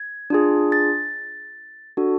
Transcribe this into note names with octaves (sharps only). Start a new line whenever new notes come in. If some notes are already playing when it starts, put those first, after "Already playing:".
Already playing: G#6
D4 F4 G#4
A6
D4 F#4 A4